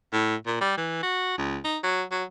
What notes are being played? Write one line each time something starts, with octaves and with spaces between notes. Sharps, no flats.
A2
A#2
G3
E3
F#4
C#2
D#4
F#3
F#3